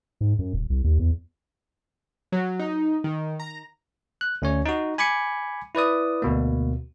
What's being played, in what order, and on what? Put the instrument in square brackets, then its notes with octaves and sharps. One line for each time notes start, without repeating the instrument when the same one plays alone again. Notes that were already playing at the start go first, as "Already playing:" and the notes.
[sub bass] G#2
F#2
D#1
C2
D#2
E2
[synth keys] F#3
D#4
D#3
A#5
[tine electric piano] F#6
D2 C#4 C#5
D#4 F#4
G#5 B5 D6 G#6 C#7
E4 B4 D5 D#6
D2 B2 A#3